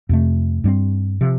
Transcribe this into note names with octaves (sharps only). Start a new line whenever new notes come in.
F2 C3 A3
G2 G3 C4
C3 F3